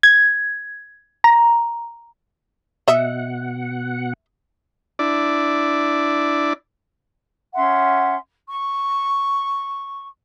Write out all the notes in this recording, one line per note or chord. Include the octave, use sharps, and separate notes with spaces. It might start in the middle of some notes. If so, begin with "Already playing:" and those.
G#6
A#5
B2 D#5 E5 F#5
D4 E4 D5
C#4 E5 F#5 C6
C#6